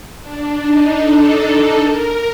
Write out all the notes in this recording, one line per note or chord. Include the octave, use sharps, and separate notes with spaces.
D4
D#4
A4
A#4